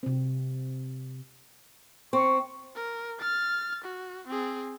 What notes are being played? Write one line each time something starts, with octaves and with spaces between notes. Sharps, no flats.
C3 C4
C4 C#6
A#4
F6 A6
F#4
C4 G#4